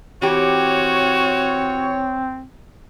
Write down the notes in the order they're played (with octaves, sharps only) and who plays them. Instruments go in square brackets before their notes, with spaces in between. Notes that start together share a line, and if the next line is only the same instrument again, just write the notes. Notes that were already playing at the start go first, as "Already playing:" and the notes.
[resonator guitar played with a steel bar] E3 G4 [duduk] C4 [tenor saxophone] F#4 [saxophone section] C#5